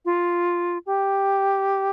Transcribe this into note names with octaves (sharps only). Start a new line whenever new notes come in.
F4
G4